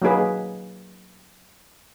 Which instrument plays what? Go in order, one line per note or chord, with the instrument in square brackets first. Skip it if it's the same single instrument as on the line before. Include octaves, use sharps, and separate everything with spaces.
[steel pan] F#3 A#3 D#4 G#4 B4